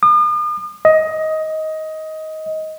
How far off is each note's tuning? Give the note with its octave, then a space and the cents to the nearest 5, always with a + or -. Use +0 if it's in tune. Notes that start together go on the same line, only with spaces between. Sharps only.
D#6 -45
D#5 +15